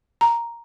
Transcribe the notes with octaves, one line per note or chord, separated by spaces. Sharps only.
A#5